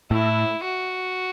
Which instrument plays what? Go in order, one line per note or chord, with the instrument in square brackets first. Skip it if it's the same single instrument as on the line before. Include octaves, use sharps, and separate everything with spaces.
[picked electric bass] A2 [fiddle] E4
[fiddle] F#4